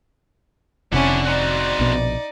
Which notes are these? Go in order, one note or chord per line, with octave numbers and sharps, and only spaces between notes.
F1 C3 C#4 D4 E4 F#5
C4 D#4 F#4 D5
A#1 B2